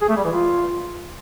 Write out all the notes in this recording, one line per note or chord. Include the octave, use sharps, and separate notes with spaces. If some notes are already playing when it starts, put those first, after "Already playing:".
G#4
A3
G3
E3
F4